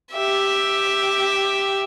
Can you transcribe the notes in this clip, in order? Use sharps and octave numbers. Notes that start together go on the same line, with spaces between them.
G4 E5